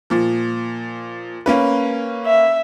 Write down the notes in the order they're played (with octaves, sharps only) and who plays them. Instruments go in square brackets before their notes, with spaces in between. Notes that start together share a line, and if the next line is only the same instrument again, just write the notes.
[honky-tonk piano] A#2 F3
A#3 C#4 B4
[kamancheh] E5